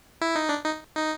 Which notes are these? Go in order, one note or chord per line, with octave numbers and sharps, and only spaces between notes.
E4
D#4
D4
D#4
D#4